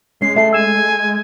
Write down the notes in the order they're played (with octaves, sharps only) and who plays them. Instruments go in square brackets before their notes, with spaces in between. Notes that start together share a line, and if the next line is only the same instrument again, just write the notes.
[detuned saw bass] G#3 [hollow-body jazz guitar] C#4 [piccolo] C7
[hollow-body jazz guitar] A3 A4 [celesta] E5 A5 [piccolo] C7
[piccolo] G#5 [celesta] E6 E7